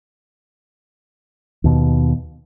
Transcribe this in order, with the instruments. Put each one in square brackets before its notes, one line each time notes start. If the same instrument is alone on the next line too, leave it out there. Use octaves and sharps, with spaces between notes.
[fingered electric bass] D#2 B2